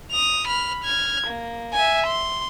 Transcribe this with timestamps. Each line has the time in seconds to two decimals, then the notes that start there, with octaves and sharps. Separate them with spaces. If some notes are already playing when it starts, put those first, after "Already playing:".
0.12 D#6 F7
0.48 B5 F6
0.84 F6 G#6
1.27 A#3
1.74 E5 G#5
2.07 C6